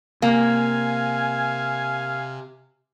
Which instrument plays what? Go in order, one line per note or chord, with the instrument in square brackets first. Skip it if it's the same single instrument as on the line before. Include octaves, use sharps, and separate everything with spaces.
[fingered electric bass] C3 [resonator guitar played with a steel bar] A#3 [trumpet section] F5 G#5